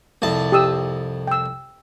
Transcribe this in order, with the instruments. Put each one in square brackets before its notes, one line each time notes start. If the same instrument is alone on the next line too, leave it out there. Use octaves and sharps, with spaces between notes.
[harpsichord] C2 F2 A5
[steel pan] G4 D#6 E6
G5 E6